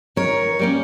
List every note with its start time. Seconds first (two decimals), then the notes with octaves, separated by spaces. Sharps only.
0.16 D#3 A#4 C#5
0.59 G3 A#3 C#4